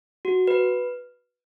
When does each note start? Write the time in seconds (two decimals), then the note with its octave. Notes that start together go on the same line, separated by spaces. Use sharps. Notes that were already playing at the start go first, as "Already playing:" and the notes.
0.25 F#4
0.47 B4